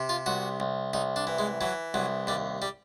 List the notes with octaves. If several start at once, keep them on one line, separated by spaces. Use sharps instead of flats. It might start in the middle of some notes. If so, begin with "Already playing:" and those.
Already playing: C3
F4
C2 F#4
C2
C2 D#4
D4
E3
G#3
E3 F#3
C2 F#3
D#2 G3
G3